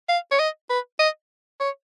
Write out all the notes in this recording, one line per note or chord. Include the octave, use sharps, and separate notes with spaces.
F5
C#5
D#5
B4
D#5
C#5